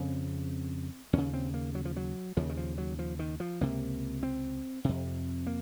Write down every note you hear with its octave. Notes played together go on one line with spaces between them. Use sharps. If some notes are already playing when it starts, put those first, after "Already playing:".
Already playing: F2 C#3 C4
D#2 C#3 C#4
C4
A#3
F#3
F3
F#3
D#2 C#3 F3
D#3
F3
F#3
F3
D#3
F3
C#2 C3 A#3
C4
F2 C3
A#3